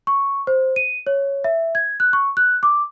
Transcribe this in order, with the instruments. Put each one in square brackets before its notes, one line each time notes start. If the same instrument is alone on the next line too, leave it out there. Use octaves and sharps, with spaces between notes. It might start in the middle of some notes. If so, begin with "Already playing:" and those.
[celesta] C#6
C5
D#7
C#5
E5
G#6
F#6
C#6
F#6
D6